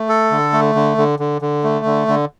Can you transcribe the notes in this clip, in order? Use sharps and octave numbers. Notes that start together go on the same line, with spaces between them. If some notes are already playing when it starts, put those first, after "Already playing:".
Already playing: A3
A4
D3
A3
D3
D3
D3
D3
A3
D3
D3